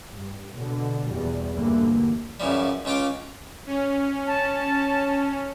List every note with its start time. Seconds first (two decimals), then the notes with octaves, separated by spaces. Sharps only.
0.14 G2
0.55 B2 D3
1.10 E2 B2 G3
1.53 D2 G2 D3 E3 A#3
2.40 F#2 C#3 E3 F3 G3
2.85 C#2 C#3 F4 G5 D6
3.67 C#4
4.27 A5